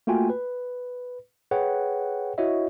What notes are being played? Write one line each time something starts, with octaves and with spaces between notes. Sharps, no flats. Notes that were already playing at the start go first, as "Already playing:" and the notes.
A3 A#3 F4 F#4 G5 G#5
B4
G#4 B4 C#5 F#5 G5
E4 F#4 C#5 D#5 E5